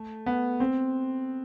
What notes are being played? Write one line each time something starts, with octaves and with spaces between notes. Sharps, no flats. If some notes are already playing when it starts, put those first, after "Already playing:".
Already playing: A3
B3
C4